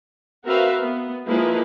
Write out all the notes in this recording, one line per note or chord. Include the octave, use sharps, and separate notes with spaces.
C4 F#4 A#4 B4 E5 F5
B3
F3 G#3 A#3 E4 A#4 B4